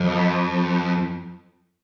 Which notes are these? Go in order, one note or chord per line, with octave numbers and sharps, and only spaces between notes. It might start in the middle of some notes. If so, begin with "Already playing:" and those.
Already playing: F2